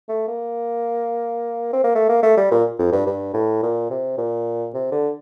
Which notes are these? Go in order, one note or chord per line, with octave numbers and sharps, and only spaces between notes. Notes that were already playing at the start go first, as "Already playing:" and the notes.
A3
A#3
C4
A#3
A3
A#3
A3
G3
A#2
F2
G2
G2
A2
A#2
C3
A#2
C3
D3